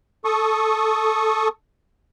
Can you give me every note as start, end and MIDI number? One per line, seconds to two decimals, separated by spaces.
0.25 1.48 69
0.25 1.48 85
0.25 1.48 87